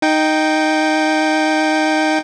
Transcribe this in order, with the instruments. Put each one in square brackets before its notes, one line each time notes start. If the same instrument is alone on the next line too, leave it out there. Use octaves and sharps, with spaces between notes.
[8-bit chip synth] D#4 G5